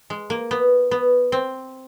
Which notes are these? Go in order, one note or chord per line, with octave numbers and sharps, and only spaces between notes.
G#3
A#3
B3
B3
C4